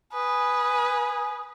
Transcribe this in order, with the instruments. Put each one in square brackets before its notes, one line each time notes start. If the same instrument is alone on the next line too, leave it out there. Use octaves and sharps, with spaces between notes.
[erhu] B4 [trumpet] G#5 [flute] D#6